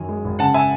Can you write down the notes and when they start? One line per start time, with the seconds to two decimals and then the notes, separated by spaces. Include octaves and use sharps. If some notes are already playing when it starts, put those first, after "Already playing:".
Already playing: F#2 D#3 G#5
0.09 G#3
0.24 G#1
0.39 C#3 F#5 A5
0.54 E5 G#5